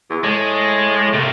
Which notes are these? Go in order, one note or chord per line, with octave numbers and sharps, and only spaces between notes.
E2
A2 G#3
C3 A3 A#3